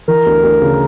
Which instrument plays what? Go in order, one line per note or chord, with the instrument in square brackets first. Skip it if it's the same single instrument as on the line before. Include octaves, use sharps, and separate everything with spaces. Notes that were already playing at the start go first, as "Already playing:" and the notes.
[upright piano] E3 [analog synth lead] A#4
[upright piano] D2
D2
C#3